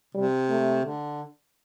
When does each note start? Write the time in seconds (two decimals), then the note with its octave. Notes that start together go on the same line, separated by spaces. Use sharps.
0.14 C3 G3
0.50 A3
0.85 D3